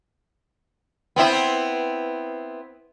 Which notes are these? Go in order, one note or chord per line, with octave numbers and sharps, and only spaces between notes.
B3 C4 E4